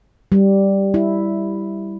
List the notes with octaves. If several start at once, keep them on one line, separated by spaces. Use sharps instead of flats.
G3
E4